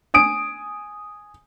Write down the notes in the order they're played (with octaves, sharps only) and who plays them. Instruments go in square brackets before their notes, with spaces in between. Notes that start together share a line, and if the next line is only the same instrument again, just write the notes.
[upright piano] G#5 D#6 D7